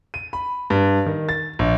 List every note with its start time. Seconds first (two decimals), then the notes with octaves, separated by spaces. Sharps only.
0.14 D#7
0.33 B5
0.70 G2
1.06 D#3
1.29 A6
1.59 A#1